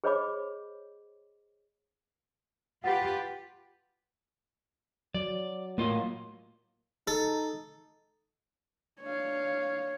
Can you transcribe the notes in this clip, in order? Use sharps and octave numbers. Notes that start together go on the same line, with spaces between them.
G#4 C5 C#5 D#5 B5 D6
F4 G4 B4 F#5 A6
F#3 D5
A2 A#3 F4 D#5
D#4 A4
D4 C#5 F5